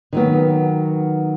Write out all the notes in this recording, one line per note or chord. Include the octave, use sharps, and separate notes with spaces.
D#3 F#3 B3